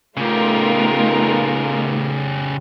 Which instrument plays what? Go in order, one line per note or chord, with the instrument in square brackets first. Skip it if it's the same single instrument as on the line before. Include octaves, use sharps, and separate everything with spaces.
[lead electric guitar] C#3 G4 [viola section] A3 B3 D#4 [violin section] F4 A#4